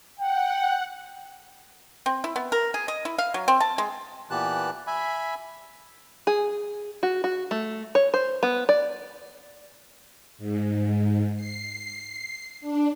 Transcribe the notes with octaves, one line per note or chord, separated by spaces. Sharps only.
F#5 G5
C4
E4
B3
A#4
G#4
D#5
E4
F5
F#3
C4
A5
G#3
A#2 E3 B3 G4 A5 F#6
E5 G#5 B5
G#4
F#4
F#4
A3
C#5
C5
B3
D5
G#2
C7
D4